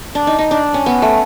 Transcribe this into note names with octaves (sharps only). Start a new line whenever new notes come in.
D4
D#4
D#4
D4
C#4
B3
A3